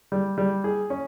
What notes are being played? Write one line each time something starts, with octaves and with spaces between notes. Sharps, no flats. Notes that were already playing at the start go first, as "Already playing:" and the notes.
G3
G3
G#4
C#4